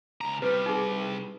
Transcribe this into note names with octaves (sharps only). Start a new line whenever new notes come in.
C#2 A#5
C3 G3 B4
D#4 G#4